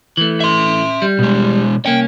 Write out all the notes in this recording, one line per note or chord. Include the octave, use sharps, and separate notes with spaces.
E3 A3
E5 C6
G3
B2 G#3
C2 A#3 C#4 G5